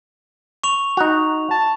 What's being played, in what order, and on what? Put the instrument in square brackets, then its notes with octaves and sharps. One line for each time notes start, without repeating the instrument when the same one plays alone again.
[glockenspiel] C#6 F7
[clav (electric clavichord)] D#4 F#4
[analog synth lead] A5